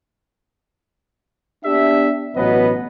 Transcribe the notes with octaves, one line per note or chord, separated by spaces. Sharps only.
B3 D4 G4 E5
A1 B2 F#3 B3 B4 D#5